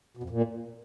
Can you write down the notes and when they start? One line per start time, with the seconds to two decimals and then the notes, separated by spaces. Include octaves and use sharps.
0.17 B2
0.23 F2
0.30 A#2